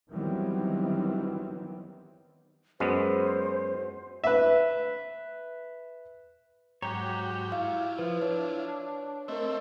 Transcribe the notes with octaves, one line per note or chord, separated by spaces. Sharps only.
D#3 E3 F#3 G3 B3 C4
F#2 G#3 B3 C5
B4 E5
G#2 F#3 F#4 G4 C#5 G5 A#5
E4 F4 F5
F3 B4
D4 C#5
A3 C4 A#4 D#5 E5